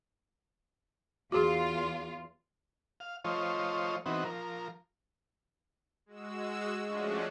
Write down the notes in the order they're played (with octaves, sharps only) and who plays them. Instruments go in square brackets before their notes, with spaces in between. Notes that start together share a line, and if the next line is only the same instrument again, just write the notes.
[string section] E2 F4 [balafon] F#4 G#4
[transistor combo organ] F5
F3 A3 F4 C5 C#5 D#5
E3 B3 C4 D#4 F#4
F3 A#4
[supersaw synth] G#3 F#4 E6
F3 G#3 A3 C#4 D4 F#4